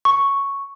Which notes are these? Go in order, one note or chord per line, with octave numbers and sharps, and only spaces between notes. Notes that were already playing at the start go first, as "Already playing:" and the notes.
C#6